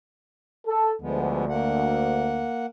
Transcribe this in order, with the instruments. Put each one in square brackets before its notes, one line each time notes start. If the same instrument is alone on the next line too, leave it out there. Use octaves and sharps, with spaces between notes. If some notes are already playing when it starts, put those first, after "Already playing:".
[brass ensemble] A4
[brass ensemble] D2 [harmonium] F3 G#3 B3
[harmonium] A#3 F#5